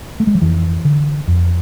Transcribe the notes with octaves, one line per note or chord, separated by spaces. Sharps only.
A3
G#3
F3
F2 E3
D3
F2